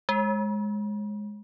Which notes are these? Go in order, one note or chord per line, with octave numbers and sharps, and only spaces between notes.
G#3